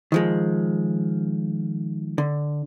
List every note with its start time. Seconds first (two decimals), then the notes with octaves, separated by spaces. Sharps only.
0.12 D#3 F3 G#3
2.18 D3